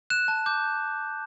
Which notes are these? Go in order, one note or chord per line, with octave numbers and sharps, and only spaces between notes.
F#6 E7
A5
D6 G6